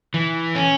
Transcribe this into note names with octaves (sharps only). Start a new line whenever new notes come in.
E3
C#4